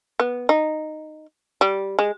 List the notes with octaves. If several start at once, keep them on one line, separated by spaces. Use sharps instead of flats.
B3
D#4
G3
G#3